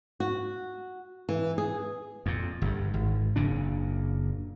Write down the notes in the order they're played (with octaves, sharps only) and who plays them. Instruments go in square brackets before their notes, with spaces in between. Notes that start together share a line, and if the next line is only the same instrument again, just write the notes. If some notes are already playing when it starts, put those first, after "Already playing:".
[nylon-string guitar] F#4
E3
G#4
[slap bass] F2 A#2
G1 G2
G#1
F#1 A#2 C#3 D4